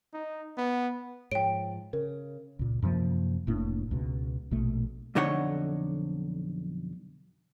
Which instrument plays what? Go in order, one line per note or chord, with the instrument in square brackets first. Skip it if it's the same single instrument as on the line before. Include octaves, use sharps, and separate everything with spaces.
[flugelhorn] D#4
B3
[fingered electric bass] G#2 F3 [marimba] C#5 [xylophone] G5 D7
[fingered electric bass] C#3 [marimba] A#4
[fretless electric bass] C#2 A#2
F#2 C3 F3 A#3
F1 A2 A#3 D4
C#2 B2
A#1 B2 A3
[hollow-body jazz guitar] B1 F2 D3 D#4 C#5 F#5